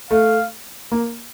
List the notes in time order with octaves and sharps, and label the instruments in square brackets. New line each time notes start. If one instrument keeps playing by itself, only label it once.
[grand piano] A3 [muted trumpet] F5
[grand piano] A#3